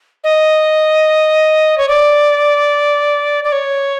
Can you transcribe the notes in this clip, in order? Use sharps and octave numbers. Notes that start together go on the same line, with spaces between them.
D#5
C#5
D5
D5
C#5